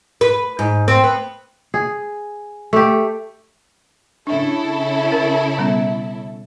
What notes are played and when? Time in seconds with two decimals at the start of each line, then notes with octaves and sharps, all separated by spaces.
0.21 B4
0.59 G#2
0.88 C4
1.04 B3
1.74 G#4
2.73 A3 G4
4.27 C#3 D4 E4 A4
5.12 A#4
5.58 B2 G3 B3